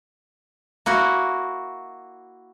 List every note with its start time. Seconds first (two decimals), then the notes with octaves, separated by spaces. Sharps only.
0.86 A#3 E4 F#4